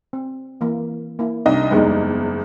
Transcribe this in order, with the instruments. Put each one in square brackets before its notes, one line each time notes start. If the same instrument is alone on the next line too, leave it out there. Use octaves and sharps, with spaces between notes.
[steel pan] C4
E3 A#3
A#3 E4
[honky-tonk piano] C2 D#5 [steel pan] D4 D#4
[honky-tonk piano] F#1 E2 [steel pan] G3 G#3 D#4